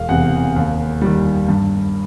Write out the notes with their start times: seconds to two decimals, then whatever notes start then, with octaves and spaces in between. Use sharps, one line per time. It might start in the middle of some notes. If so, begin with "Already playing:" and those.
Already playing: E1 F5
0.09 E2 C3 F#5
0.56 D#2
1.02 D#3 G3
1.49 G2